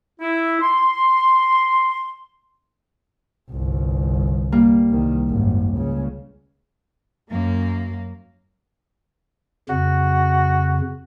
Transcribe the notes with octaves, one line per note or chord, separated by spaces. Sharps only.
E4
C6
G1 C2
G3 A#3
C2 D#3
G#1 F#2
C#2 C#3
F#2 A#3
F2 C#3 F#4